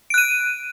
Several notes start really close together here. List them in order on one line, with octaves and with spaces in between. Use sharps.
D7 F#6 D#7